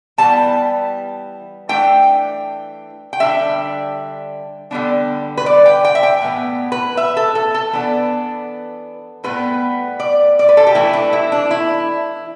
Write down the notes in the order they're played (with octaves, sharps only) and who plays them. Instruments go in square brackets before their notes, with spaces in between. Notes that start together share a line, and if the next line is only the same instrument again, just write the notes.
[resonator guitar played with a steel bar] E3 G3 B3 A5
E3 A3 D4 G5
G5
D3 G3 D4 E5
D3 G3 B3 D4
B4
D5
G5
G5
E5
G5
A2 E3 B3
B4
E5
A4
A4
A4
E3 B3 D4
A2 G3 B3 B4
D5
D5
B4
A4
G4
E3 A3 D4 E4
D4
E4
D4
E4